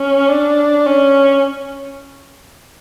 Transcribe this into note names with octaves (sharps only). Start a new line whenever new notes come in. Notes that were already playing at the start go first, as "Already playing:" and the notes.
Already playing: C#4
D4
C#4